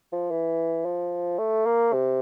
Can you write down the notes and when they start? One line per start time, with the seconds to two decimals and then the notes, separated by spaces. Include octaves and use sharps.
0.12 F3
0.31 E3
0.85 F3
1.38 A3
1.66 A#3
1.93 C3